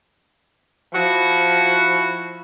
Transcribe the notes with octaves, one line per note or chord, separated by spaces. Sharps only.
F3 E4 F#4